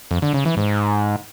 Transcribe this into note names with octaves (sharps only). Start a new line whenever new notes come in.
F2
D3
C#3
E3
G#2